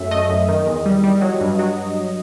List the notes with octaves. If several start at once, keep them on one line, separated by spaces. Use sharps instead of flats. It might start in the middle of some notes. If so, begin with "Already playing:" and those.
Already playing: F#2 A3 E5
A3 D#5
F#2
D#3
E2
G3
G3
F#3
G2
F#3